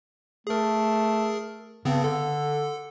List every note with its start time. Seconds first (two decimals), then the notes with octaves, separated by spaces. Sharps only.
0.47 A3 G#4 A#4
1.85 G2 C#3 B3 C4
2.04 D3 A4